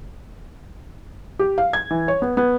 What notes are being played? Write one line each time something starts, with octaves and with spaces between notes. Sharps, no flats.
G4
F5
G#6
E3
C#5
B3
B3